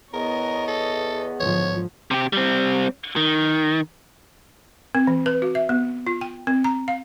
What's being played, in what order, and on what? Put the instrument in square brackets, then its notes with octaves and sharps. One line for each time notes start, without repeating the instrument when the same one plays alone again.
[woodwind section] E2 B3 [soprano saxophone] A#4 [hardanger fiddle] C#5 D#5
[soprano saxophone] A4
[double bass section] G#2 D3 F3 [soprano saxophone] C#5
[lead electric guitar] C3 G4
G3 C4
D#3
[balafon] C4
E3
B4
F#4
E5
B3
F4
G5
C4
A#5
F5